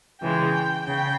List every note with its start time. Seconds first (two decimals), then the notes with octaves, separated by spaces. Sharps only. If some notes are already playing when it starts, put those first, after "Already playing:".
0.22 C#3 E3 G#3 G5
0.87 C#3 G5